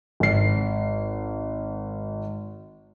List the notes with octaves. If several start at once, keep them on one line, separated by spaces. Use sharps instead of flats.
G#1 C7